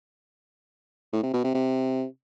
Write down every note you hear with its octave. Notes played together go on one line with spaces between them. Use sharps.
A2
C3
B2
C3
C3